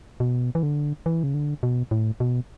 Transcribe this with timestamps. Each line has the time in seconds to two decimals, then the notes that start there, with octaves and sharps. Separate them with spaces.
0.20 B2
0.55 E3
0.63 D3
1.06 E3
1.23 C#3
1.34 D3
1.63 B2
1.91 A2
2.20 B2